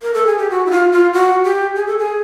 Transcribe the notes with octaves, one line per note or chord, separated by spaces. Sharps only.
A#4
A4
G#4
G4
F#4
E4
F4
F4
F#4
G4
G#4
A4
G#4